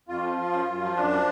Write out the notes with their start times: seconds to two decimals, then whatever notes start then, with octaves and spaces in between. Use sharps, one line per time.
0.08 F2 F4
0.23 F3
0.38 F3
0.52 F#2
0.67 F#2
0.81 F3
0.96 F#2 D4
1.11 F3